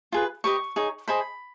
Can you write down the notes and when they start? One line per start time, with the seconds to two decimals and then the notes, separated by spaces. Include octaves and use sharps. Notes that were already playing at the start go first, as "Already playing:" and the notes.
0.12 F4 G#4 B4
0.44 G4 B4 D#5 C#6
0.76 D#4 G#4 C#5
1.08 G#4 C5 D#5 B5